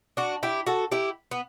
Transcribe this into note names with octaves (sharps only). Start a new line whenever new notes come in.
D4 F#4
E4 G4
F#4 A4
E4 G4
B3